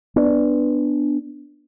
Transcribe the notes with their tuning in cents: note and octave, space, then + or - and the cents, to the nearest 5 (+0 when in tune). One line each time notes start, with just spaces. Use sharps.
B3 +0 D4 +5